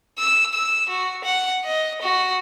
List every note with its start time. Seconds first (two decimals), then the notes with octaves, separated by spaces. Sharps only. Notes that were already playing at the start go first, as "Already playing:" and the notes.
0.19 E6
0.54 E6
0.90 F#4
1.25 F#5
1.64 D#5
2.02 F#4